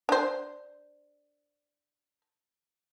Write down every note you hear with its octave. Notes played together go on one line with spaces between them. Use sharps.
D4 C5